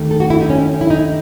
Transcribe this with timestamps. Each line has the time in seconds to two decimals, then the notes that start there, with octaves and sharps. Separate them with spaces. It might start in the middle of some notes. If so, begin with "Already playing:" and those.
Already playing: D#2 D#3 A3
0.11 A4
0.20 F#4
0.30 E4
0.41 D#4
0.50 C#4
0.81 E4
0.90 D#4